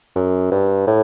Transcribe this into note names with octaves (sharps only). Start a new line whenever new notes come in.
F#2
G2
A2